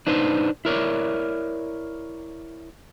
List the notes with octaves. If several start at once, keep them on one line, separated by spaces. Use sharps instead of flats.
D4 D#4 B4 C5
E4 A#4 C#5 D5